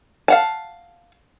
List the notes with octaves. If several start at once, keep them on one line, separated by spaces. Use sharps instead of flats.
F5 F#5 A5